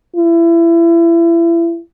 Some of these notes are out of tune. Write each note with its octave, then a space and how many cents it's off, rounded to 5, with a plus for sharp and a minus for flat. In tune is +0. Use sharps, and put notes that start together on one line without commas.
E4 +30